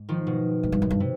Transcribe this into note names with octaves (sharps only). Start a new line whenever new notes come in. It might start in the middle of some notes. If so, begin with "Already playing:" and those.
Already playing: G#2
D#3 F3
B2
G#2
G2
F#2
G2
C3